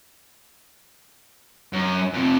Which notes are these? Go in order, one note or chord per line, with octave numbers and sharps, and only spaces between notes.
F#2
F2 C3